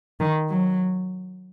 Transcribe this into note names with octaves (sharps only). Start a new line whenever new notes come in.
D#3
F#3